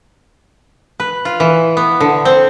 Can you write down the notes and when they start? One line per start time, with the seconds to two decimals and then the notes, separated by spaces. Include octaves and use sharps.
1.00 B4
1.25 F4
1.40 E3
1.77 B3
2.01 D3
2.25 C4